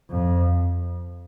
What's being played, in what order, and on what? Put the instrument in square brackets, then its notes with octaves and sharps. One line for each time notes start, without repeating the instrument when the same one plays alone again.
[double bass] F2